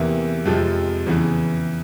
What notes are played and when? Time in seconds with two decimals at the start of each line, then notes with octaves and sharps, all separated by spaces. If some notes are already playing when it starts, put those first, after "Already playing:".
Already playing: E2 C3 E3 A#3 E4
0.45 F2 C3 F3 G#3
1.06 E2 C#3 E3